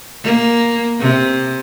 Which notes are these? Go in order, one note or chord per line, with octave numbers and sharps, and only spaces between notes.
A#3
C3